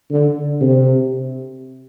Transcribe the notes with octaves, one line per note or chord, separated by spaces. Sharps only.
D3
C3